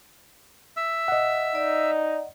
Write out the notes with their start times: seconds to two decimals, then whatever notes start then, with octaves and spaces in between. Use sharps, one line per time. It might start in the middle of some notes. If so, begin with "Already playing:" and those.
0.77 E5 E6
1.08 D#5 F#5
1.55 D#4 D5